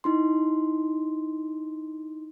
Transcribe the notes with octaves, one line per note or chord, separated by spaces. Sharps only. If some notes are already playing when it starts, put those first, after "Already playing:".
D#4 E4 C6